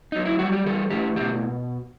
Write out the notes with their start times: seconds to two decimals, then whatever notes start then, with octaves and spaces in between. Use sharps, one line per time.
0.12 F#3 D#4
0.25 E4
0.39 G3 F#4
0.52 G4
0.66 E3 A4
0.90 A2 G4
1.16 B2 G4